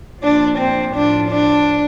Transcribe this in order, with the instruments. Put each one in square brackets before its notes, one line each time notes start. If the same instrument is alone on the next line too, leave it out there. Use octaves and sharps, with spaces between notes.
[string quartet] A#2 F3 D4
C4
A2 F3 D4
D4